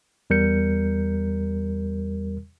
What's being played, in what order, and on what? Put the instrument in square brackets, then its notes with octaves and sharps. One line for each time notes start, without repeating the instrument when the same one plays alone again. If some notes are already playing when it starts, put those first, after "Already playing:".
[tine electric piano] E2 G3 A#4 G6 C#7